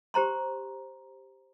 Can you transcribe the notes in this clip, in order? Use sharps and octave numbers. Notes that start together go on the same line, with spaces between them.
G4 C5 A#5 C6